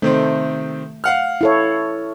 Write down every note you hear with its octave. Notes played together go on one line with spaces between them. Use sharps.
C3 D#3 A3 C4
F5 F#5 F6
E4 A4 C#5